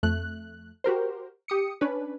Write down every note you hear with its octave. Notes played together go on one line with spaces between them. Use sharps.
F2 A3 F#6
F#4 G4 A#4 C5
G4 D#6 C#7
C#4 D4 B4